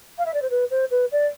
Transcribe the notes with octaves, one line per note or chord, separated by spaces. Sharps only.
F5
E5
D5
C5
B4
C5
B4
D5